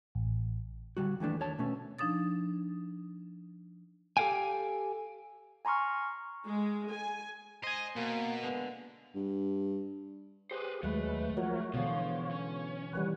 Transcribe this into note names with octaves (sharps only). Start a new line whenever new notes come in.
A1
D3 G3 F#4
D#2 E3 A3 D4
D#2 C#5 A5
B2 A3 C#4
F3 D4 D#4 D#6 A6
G4 A4 A#4 F5 G5 G#5
G#5 A#5 C6 C#6 F6
G#3
G#5
C5 D#5 G#5
B2 A#3
D3 G#3 B3
G2
G4 G#4 B4 C5
D#2 F#3 G#3 A3 B4
F3 F#4 A#4 C#5
B2 D3 E3 F3 C#5
C#4
D#3 E3 G3 B4 C#5 F#5